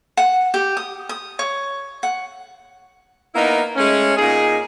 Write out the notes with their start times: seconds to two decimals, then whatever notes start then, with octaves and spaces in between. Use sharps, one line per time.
0.17 F#5
0.54 G4
0.77 D#6
1.09 D#6
1.39 C#5
2.03 F#5
3.35 A#3 B3 D#4 E4 A#4
3.76 G#3 A3 C#4
4.17 A#2 D#4 G#4